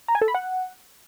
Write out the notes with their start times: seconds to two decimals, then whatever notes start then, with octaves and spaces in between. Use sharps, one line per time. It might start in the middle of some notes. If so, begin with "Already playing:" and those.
0.08 A#5
0.15 G#5
0.21 A4
0.28 B5
0.34 F#5